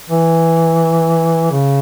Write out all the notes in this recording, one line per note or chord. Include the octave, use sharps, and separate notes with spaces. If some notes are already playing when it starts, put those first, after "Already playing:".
E3
C#3